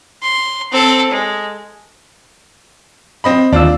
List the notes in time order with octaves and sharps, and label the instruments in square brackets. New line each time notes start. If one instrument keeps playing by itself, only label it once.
[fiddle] C6
C4 A4
G#3
[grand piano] C4 D#5 B5
[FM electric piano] D#2 E6 [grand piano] D4 F4